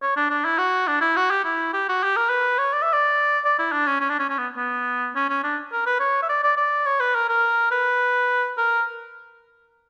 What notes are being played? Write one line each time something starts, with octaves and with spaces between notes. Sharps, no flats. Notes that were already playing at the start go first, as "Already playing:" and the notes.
C#5
D4
D4
E4
F#4
D4
E4
F#4
G4
E4
G4
F#4
G4
A#4
B4
C#5
D5
E5
D5
D5
E4
D4
C#4
C#4
D4
C#4
C#4
B3
B3
C#4
C#4
D4
A#4
B4
C#5
E5
D5
D5
D5
C#5
B4
A#4
A#4
B4
A#4